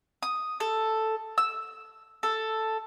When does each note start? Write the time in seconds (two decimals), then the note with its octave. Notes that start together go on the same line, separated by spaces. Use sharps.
0.23 D#6
0.60 A4
1.38 E6
2.23 A4